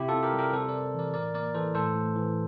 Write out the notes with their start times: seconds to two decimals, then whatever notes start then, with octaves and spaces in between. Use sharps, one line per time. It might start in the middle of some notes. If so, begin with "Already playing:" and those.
Already playing: C3 E4 G4
0.08 F4 A4
0.14 C3
0.23 G4 A#4
0.33 G3
0.39 G4 A#4
0.53 C3 A4 C5
0.68 A#4 D5
0.74 C3
0.95 E3 A#4 D5
1.14 A2 A#4 D5
1.34 A#3 A#4 D5
1.55 E3 A4 C5
1.75 A2 A4 C5
1.95 A2
2.16 E3